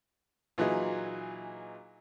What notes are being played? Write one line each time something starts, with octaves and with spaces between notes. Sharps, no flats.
A#2 E3 F#3 D#4 G#4